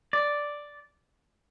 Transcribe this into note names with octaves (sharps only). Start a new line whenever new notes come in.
D5